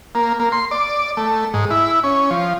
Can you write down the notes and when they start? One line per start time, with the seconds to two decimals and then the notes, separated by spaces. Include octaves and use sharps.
0.15 A#3
0.39 A#3
0.52 C6
0.71 D5
1.17 A3
1.54 G#2
1.70 E4
2.04 C#4
2.31 F3